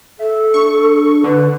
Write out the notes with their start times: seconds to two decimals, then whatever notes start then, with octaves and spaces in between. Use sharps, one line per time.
0.19 A4 E5
0.54 D4 C#6
1.24 D3 B4